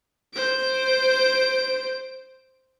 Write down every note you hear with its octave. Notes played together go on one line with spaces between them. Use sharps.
C5 D7